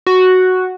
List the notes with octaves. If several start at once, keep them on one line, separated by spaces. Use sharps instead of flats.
F#4